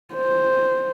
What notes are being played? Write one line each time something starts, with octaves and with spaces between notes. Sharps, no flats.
C5